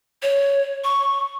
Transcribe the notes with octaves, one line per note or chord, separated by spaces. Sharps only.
C#5
C#6